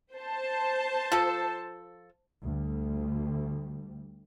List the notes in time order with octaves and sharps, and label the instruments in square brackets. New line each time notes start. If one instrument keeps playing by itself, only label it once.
[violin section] C5 A5
[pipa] F3 A4
[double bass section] D2 G3